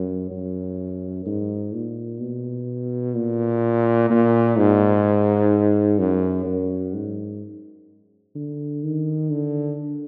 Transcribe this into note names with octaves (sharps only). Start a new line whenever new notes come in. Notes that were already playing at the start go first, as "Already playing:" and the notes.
Already playing: F#2
F#2
G#2
A#2
B2
A#2
A#2
G#2
F#2
F#2
G#2
D3
D#3
D3